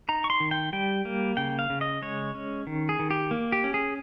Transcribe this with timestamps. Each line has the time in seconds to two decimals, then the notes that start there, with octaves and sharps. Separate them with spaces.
0.09 D#4 A#5
0.24 C#6
0.30 C6
0.40 D#3
0.51 G5
0.73 G3 G5
1.05 A#3
1.37 C#3 G5
1.59 F5
1.70 C#3
1.81 D#5
2.02 G#3 C#5
2.35 C#4
2.67 D#3
2.89 G#4
2.99 D#3
3.11 G4
3.31 A#3
3.52 G4
3.64 C#4
3.74 G#4